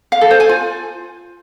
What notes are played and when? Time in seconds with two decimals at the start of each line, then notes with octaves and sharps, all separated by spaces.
0.12 F5
0.21 A4
0.31 C5
0.40 G#5
0.49 F4